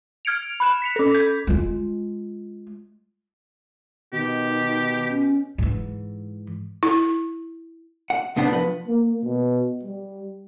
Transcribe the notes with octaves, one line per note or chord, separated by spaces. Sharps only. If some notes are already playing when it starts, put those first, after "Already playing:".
F6 G#6 C#7 D7 F7
B5 F#6 E7
B6 C#7 F7
C#4 A4
G6 G#6 B6
G#3 F4
B2 D#3 G4
C#4
G#2 E3
E4
F#5
C2 A2 B3 D4 C5 F#5
F3 B4
A#3
B2
G3